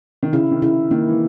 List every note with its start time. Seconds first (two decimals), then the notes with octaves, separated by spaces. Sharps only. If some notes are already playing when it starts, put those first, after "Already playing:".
0.23 D#3
0.33 C#3 E4
0.51 D#3
0.62 C#3 E4
0.91 D#3 A#3
1.09 E3